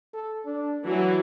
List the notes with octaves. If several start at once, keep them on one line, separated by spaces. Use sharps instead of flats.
A4
D4
E3 F#3 F#4